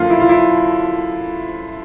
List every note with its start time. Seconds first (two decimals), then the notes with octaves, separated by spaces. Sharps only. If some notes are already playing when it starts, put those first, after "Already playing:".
Already playing: F#2 D3 F3 A#3 F4
0.10 E4
0.20 F4
0.29 E4